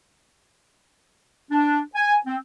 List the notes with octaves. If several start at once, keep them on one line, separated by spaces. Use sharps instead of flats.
D4
G#5
C4